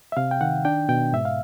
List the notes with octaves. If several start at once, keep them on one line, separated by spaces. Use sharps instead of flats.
E5
C3 F5
G5
D#3 F#5
D4 G5
B2 G5
G#2 E5
F5